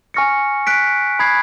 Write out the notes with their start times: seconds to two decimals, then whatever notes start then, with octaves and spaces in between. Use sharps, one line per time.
0.14 G#5 C#6 F6 A#6 C#7
0.67 F#6 B6 D7
1.19 B5 D#6 G#6 C7